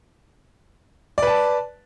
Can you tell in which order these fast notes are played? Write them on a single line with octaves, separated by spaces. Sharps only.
D5 B4 A5